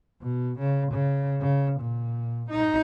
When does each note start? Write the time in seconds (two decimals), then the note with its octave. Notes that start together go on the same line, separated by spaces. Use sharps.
0.21 B2
0.59 C#3
0.92 C#3
1.41 C#3
1.80 A#2
2.50 D#4